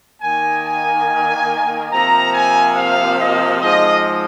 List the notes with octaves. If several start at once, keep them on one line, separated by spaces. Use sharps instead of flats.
D#3 A#3 G#5
G#5
C3 F3 A#3 A#5
G#5
F5
D#5
G#2 F3 G#3 C4 D#5